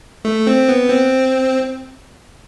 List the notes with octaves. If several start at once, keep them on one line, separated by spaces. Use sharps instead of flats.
A3
C4
B3
C4